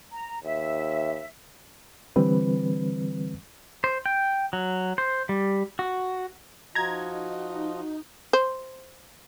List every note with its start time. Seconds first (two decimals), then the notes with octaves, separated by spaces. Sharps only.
0.12 A#5
0.44 D#2 E5
2.16 D3 E3 G3 C4 B4
3.84 C5
4.06 G5
4.53 F#3
4.98 C5
5.29 G3
5.79 F#4
6.75 F3 D#4 F4 F#4 D#5 A#5 G#6
8.33 C5